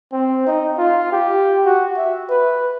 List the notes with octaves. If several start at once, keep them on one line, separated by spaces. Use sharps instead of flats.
C4
D#4
F4
G4
F#4
E5
B4